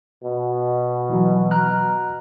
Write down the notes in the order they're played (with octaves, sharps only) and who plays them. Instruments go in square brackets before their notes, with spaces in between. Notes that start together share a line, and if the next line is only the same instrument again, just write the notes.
[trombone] B2
[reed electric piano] E3 F#3
A#5 F6 F#6